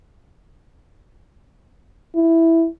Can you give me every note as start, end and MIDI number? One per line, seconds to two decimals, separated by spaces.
2.15 2.67 64